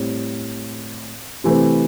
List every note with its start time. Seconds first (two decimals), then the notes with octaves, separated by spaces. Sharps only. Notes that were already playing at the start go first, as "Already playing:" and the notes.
Already playing: A2 G3 C4
1.44 C3 E3 A3 C4